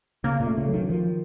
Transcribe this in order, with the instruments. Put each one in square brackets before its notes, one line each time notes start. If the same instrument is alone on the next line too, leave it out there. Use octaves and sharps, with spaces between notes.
[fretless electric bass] C#3 [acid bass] A#3
[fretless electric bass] A#2
[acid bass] A3
[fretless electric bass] C#3
[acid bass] F#3
[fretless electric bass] D#3
[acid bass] D#3 [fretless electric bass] F3